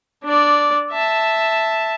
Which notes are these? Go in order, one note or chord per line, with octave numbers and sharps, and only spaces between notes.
D4 D5
E5 A5